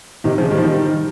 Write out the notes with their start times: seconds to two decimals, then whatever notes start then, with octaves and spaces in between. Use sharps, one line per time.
0.24 C3 D#3
0.38 C#3 F3
0.45 G#3
0.51 D#3 G3
0.58 F3
0.64 D#3 G3